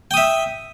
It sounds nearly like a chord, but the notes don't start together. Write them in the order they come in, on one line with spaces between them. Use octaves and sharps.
G5 D#6 E5